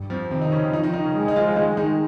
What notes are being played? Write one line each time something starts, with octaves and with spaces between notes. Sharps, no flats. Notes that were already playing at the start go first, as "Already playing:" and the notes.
Already playing: G2
F2 F3
C3 D#3 C4
D#4
C#3 C#4
D#3 F3 D#4
D#3 D#4
D#3 D#4
C#3 C#4
G#3
D#4
F3 F4
D#3 D#4
D#3 D#4